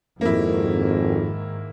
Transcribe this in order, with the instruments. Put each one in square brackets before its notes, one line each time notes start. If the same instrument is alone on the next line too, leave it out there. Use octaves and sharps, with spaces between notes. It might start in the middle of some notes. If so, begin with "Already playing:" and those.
[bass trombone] G#1 [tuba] F2 [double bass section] G#2 D#3 [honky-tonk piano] A#3 E4